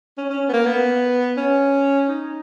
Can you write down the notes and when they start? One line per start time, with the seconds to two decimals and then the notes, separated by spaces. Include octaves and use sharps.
0.18 C#4
0.30 C#4
0.49 B3
0.53 A#3
0.66 B3
1.37 C#4
2.09 D#4